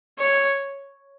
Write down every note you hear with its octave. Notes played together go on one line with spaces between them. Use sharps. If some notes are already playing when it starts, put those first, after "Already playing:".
C#5